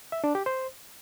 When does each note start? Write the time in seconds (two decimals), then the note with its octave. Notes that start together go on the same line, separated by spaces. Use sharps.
0.12 E5
0.24 D4
0.35 G4
0.46 C5